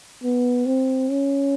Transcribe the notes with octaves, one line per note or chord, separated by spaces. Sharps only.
B3
C4
C#4